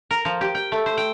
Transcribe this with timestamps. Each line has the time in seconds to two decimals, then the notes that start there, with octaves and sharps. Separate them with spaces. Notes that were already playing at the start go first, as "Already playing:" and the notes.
0.11 A#4
0.25 F3
0.41 G4
0.55 G5
0.72 A3
0.86 C5
0.97 G5